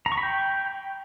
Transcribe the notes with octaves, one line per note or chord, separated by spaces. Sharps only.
A#5
C#6
B5
G5